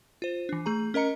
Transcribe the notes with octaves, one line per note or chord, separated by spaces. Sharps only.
F4 C5
E3 D4
A3 G#4 A#5
C#4 A#4 D#5 A#5 C#7